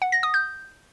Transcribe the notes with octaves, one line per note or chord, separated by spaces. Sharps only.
F#5
A#6
D#6
G6